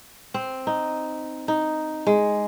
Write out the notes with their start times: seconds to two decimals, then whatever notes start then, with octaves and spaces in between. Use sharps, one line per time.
0.34 C4
0.67 D#4
1.48 D#4
2.07 G#3